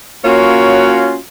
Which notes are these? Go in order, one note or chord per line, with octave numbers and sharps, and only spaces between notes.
A#3 C#4 F4 F#4 C#5